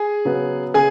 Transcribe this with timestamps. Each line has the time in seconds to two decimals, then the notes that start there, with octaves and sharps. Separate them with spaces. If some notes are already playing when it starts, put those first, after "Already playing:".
Already playing: G#4 G#5
0.25 C#3 F#3 B3
0.74 C#3 G#4 G#5